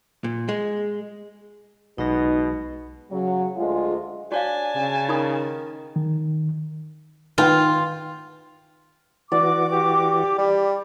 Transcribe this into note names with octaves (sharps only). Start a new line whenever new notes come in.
A#2
G#3
B1 B2 G#3 D#4 A#6
C#3 F#3
D2 G#3 F4 G#4
D4 F#4 C#5 F5 G#5 A5
C#3
D#3 D#4 B5 D#6
D#3
D#3 F4 B4 G5
E3 F#4 D5 D6
G4
G3